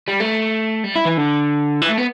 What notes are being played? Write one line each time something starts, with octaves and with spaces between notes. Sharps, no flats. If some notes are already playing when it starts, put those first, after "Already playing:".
G3
A3
G3
E4
E3
D3
E3
A3
B3